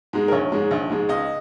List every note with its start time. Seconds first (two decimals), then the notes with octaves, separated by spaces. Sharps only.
0.13 G#2 G#3
0.28 A#4
0.32 A#1 C#5
0.52 G#2 G#3
0.71 A#1
0.90 G#2 G#3
1.09 C#2 D#5